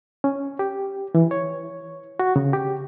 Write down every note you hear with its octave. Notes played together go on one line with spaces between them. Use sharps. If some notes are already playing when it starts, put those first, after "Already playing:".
C#4
G4
E3
C#5
F#4
C#3
G4